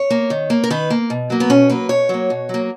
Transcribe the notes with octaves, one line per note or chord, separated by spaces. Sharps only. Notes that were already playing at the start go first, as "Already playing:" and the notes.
Already playing: C#5
A#3
D#3
A#3
A#4
D#3 B4
A#3
B2
F#3 A#3
B3
B2 C#4
F#3 A#3 B4
B2 C#5
F#3 A#3
B2
F#3 A#3